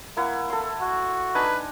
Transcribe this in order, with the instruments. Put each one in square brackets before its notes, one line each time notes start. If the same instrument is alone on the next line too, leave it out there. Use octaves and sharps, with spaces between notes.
[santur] A#3 E4 F#5
A4 C6
[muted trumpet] F#4
[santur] D4 D#4 G#5 [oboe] B4